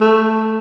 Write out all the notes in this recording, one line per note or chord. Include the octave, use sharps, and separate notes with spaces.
A3